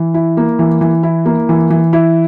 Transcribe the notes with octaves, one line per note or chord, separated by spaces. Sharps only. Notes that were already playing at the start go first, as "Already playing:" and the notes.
Already playing: E3
E4
A#3
E3
E3
E4
A#3
E3
E3
E4